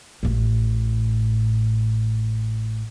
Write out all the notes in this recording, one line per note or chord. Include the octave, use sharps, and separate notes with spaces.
A1 A2